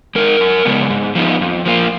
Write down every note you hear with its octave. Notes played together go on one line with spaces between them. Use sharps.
G#3 D#4 A#4
F#2
C#3 G#3 B3
G#2
F3 B3 D#4
F2
F3 A#3 F4